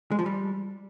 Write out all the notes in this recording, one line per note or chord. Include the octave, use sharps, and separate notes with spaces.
G#3
F3
G3